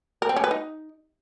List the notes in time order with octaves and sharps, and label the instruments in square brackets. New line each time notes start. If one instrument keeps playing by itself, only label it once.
[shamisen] A#4
C4
C#4
B4
D#4